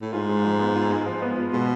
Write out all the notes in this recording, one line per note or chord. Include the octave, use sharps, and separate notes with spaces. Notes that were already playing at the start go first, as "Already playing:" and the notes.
A2
G#2 F4
G#3
F3
B3
F4
G#3
F3
B3
F4
B2 G#3